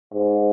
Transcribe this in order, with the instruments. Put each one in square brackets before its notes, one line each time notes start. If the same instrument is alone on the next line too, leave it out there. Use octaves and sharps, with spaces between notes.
[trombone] G#2